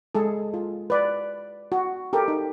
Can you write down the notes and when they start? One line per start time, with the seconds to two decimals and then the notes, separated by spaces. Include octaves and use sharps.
0.15 G#3 G#4 A4
0.54 F4
0.90 B4 D5
1.72 F#4
2.13 G4 A4 A#4
2.28 D#4